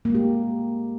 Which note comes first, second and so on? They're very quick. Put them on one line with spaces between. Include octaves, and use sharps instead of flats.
A#3 G#3 G4